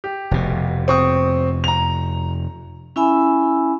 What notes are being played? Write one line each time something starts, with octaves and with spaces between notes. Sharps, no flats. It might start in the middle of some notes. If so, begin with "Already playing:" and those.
G4
F1 B2
C4 C#6 D#6
A#5 F7
C#4 E4 E5 G#5 B5 E6